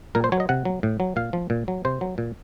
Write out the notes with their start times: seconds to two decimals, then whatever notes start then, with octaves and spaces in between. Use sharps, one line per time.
0.15 A#2 A#4
0.24 C5
0.32 F#3 C#5
0.40 D#5
0.49 C3 F#5
0.65 F#3
0.83 A2
1.00 F#3
1.16 A#2 F5
1.33 F3
1.50 A#2
1.68 F#3
1.85 C3 C5
2.01 F#3
2.18 A#2